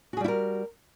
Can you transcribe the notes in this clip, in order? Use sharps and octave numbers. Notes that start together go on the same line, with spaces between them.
G3 E4 F#4 G#4 A#4